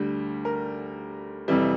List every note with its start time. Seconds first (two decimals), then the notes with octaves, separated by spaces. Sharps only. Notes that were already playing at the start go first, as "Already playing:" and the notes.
Already playing: D2 D3 G3 G4
0.45 A#4
1.48 F2 C3 E3 G3